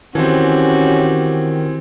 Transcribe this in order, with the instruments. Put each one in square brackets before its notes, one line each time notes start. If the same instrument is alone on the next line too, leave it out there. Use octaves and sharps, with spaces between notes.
[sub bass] D#3 [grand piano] E3 C4 [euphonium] C#4 [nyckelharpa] F#4 G4